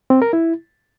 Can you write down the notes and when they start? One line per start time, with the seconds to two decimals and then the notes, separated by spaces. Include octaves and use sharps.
0.10 C4
0.22 A#4
0.33 E4